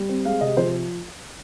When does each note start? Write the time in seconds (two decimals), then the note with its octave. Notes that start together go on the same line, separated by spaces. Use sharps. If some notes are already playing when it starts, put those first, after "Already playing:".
Already playing: G3
0.09 C4
0.25 G#3 F5
0.41 C3 D#5
0.57 F3 C5